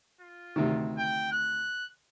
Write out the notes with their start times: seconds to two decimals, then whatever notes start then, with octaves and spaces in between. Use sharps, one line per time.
0.21 F4
0.56 D2 C3 D#3
0.98 G5
1.32 F#6